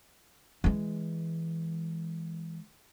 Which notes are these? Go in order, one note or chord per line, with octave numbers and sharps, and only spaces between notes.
E3 G#3